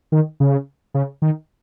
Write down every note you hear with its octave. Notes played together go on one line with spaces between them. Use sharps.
D#3
C#3
C#3
D#3